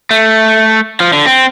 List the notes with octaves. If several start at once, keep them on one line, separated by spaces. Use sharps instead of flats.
A3
F3
D3
C4